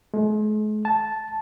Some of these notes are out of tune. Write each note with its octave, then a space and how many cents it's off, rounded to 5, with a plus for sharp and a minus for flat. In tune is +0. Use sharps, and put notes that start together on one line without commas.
G#3 +45
A5 -10